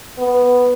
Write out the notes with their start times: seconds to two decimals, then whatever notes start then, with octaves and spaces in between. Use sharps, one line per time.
0.19 B3